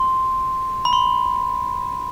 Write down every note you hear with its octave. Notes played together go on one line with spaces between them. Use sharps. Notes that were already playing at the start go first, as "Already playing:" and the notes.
Already playing: C6
B5
C6